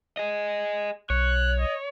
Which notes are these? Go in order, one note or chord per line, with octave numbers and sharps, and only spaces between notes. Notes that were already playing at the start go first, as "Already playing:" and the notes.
G#4 D#5
B1 C#5 F#6
D#5